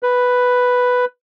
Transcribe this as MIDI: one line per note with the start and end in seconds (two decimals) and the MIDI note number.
0.03 1.05 71